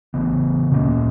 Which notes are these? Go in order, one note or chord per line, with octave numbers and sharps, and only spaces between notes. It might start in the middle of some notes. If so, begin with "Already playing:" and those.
C#3 E3 B3
A#2 A#3 C#4